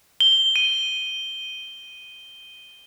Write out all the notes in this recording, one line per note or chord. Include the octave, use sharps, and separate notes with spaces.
G7
D#7